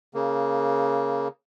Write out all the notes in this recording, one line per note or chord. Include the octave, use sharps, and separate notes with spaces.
C#3 A#3